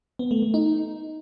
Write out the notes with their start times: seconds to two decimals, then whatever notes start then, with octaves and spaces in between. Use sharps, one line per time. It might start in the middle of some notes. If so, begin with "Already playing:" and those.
0.19 B3
0.31 A3
0.42 A3
0.54 D#4